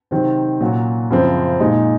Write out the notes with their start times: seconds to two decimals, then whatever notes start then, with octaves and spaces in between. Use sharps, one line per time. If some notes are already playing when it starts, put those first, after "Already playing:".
0.11 C3 D#3 F#3 C4
0.61 A#2 F#3 C#4 F#4
1.10 F#2 C#3 F3 C4
1.60 A#2 G#3 D#4